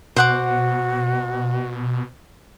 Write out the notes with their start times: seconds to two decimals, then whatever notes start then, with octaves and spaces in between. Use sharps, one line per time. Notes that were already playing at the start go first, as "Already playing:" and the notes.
0.16 B2 F#4 C5 F#5 D6